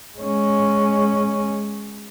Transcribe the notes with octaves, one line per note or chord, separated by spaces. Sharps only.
G#3 C#4